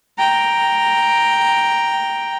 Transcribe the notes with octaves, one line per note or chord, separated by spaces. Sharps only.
G5 A#5